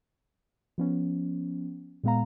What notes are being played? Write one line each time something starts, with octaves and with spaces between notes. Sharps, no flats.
F3 B3 C#4
A#2 G#3 B3 F5 A#5